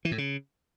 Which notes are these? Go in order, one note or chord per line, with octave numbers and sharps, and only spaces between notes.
E3
A2
C#3